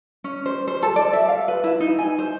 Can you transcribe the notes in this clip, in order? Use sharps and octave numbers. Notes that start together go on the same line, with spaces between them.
C#4
C5
C5
A4
D5
E5
F5
B4
E4
D#4
G#5
C5